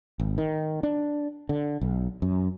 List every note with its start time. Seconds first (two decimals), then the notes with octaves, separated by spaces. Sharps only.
0.20 G#1
0.38 D#3
0.83 D4
1.49 D3
1.81 B1
2.22 F#2